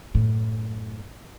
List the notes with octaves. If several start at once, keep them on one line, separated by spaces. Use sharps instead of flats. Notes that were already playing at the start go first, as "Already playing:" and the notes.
F#2 A2